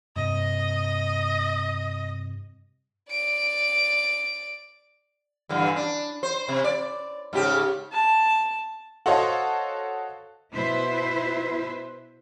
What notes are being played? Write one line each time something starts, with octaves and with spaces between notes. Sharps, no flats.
G2 C3 D#5
D5 D7
G2 D3 E3
D4
C5
C3
D5
G#2 C#3 G4
A5
F#4 A4 C5 C#5 D#5 F5
B2 E4 B4 C5 E5